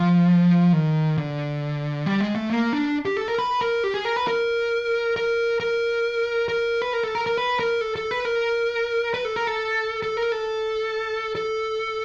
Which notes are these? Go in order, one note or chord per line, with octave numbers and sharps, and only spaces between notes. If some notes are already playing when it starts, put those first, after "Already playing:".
Already playing: F3
D#3
D3
G3
G#3
A3
A#3
D4
G4
A4
A#4
B4
A#4
G4
G#4
A#4
B4
A#4
A#4
A#4
A#4
B4
A#4
A4
A#4
A#4
B4
A#4
A4
A4
B4
A#4
B4
A4
A#4
A4
A4
A#4
A4
A4